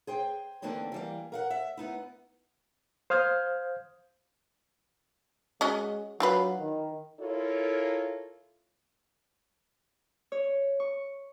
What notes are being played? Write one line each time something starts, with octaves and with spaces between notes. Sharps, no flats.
G#4 C5 G5
E2 D3 A#3 C4 D4 D#4
E3 G3 A#3
A#4 F5 F#5
E5
B3 D#4 E4
C5 F5 D#6 F6 G6 G#6
G#3 C#4 F#4 D#5
F#3 D4 F4 B4
D#3
E4 F4 A4 A#4 C#5
C#5
C#6